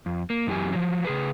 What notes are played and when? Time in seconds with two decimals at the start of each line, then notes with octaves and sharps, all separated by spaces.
0.06 F2
0.30 A#3
0.47 F#2 E3 F#3 G4 G#5
0.73 F3 F#3
1.05 C#3 G#4 B4